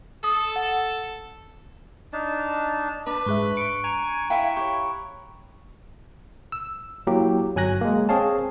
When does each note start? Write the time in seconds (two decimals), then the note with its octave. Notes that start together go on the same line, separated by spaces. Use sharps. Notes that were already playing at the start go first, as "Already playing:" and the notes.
0.24 A4 D#6
0.56 F#5
2.13 D4 D#4 A5
3.07 D4 B4
3.26 G#2 G#4 E5 C#6 F#6
3.57 C#6 C#7 D7
3.84 G#5 A#5 G#6 F7
4.30 E4 E5 F5 G5
4.57 G4 C#5 C#6
6.52 E6
7.07 F#3 A#3 E4 G4
7.56 G1 F#3 G#5 F#6 A#6
7.81 G#3 A#3
8.09 C4 G#4 C#5 F5 A5